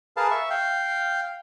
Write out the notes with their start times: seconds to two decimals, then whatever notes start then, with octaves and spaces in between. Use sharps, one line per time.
0.17 G#4 A#4 B4 F5 A5
0.31 E5 C#6
0.50 F5 G5